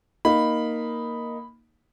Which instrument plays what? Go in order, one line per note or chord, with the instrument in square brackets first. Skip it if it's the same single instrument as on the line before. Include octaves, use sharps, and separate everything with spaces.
[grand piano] A#3 D#4 [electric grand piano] B5